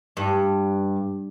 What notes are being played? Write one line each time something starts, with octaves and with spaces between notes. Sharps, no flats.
G2